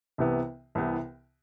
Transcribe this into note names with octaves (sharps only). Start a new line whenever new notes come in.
C2 C3 E3 B3
C2 C3 E3 B3